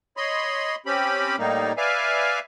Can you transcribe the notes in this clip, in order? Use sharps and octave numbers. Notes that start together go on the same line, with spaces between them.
C#5 D#5 B5 C6
C4 C#4 G4 B5
A2 G3 A#3 D#4
B4 D5 E5 F5 G#5